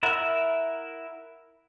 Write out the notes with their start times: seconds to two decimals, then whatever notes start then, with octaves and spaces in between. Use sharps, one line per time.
0.03 E4 A#4 E5 F#5